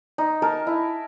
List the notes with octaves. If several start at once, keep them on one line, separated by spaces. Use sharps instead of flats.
D#4
A#4 G#5 A5
E4